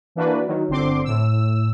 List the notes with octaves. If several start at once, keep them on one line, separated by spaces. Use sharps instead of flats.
E3 A#3 D4 F#4 B4
D#3 F#3
G1 D3 C4 C6 D6
A2 E6